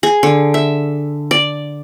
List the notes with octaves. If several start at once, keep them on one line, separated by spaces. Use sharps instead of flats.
G#4
D3
E5
D5